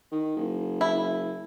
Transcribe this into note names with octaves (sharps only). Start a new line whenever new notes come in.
D#3
F#1
E4